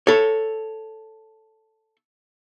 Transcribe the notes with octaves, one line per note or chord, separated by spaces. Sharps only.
A4 C#5